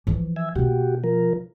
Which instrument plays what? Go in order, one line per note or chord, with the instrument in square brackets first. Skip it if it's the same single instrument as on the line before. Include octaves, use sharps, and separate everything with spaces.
[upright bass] E3 F3
[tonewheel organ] E5 G#5
[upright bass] B2 A#3 [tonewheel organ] F#4 G4
[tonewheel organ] F3 A#4